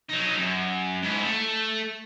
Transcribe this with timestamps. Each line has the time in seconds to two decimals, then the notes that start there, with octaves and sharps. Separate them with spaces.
0.10 F#3 D#4
0.38 F#2
1.03 G#2 E4
1.25 A3